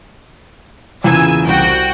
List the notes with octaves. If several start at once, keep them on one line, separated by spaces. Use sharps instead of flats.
E2 A#2 C#3 G#5 E6
C2 F#4 G5